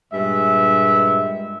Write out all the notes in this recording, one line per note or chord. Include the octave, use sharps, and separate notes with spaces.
G2 A#2 G#3 E5